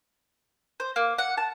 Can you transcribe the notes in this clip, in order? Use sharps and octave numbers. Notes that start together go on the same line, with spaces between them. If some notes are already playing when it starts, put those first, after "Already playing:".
C5
A#3
F#5
A5